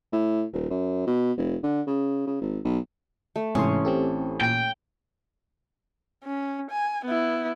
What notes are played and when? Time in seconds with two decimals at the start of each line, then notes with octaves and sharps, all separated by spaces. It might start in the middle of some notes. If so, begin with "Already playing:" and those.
0.12 A2
0.53 D#1
0.70 F#2
1.06 B2
1.37 F1
1.63 D3
1.87 C#3
2.26 C#3
2.41 G#1
2.64 B1
3.36 A3
3.55 A1 G#2 C3 E3 C#4 C6 D#6
3.85 C4 G4 A4
4.41 A#2 G5
6.24 C#4
6.71 G#5
7.05 B3 E4